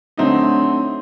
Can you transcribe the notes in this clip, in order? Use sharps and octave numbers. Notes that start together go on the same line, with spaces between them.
D3 F#3 A3 C4 D#4